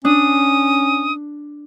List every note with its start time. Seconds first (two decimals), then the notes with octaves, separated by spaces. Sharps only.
0.05 C#4 D4 D#6